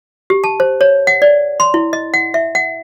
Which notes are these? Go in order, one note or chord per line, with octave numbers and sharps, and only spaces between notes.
G4
A5
C5
C#5
F#5
D5
C6
E4
D#5
F#5
E5
F#5